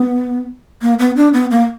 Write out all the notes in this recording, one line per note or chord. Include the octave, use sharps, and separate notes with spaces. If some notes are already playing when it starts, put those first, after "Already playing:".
Already playing: B3
A#3
B3
D4
B3
A#3